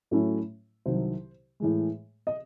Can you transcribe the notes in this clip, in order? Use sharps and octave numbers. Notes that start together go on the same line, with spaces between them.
A2 F#3 A3 C#4 E4
C2 C3 D#3 F#3 C5
A2 E3 G#3
D#5